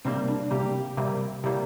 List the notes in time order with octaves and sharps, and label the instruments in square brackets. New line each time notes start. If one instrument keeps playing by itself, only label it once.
[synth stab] C3 G3 A#3 [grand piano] C4
[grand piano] D4
[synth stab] C3 G3 A#3 [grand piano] G4
[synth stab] C3 G3 A#3
[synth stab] C3 G3 A#3 [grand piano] E4